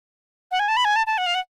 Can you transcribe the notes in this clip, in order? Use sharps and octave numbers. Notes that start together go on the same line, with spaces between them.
F#5
G#5
A5
B5
G#5
A5
A5
F#5
F5
F#5